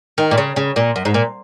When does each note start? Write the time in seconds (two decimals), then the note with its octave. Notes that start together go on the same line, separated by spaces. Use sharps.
0.18 D#3
0.31 A#2
0.38 C#3
0.56 C#3
0.76 A#2
0.96 F#2
1.05 G#2
1.14 A#2